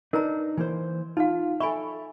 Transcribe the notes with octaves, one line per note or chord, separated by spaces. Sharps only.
D4 D#4 A#4 B4 A#5
E3 A#3 C5
D#4 F4 F5
A4 E5 G#5 B5 C#6